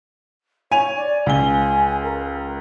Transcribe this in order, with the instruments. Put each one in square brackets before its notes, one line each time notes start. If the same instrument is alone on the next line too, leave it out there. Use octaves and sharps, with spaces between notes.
[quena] C#5 [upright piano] G#5 D#7 F7
[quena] D5
[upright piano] C#2 G7 [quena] G#5
[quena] A#4